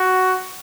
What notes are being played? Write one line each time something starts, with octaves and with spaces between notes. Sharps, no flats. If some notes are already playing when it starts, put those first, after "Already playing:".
Already playing: F#4